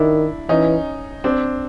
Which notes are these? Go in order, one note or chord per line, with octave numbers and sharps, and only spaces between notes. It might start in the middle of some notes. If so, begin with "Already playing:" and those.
Already playing: D#3 D4 E4
E3 C#4 D#4
C4 D4